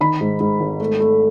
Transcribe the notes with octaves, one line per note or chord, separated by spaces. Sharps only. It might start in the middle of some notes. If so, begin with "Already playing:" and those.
D#3 B5
G#2
G#2
G#1
A3
A3